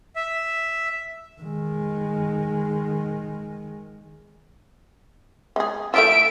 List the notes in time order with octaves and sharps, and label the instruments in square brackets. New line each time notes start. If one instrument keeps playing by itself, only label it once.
[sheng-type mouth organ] E5
[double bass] D#3 G#3
[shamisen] G#3 G#4
[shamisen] A3 E4 F4 [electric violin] E5 D7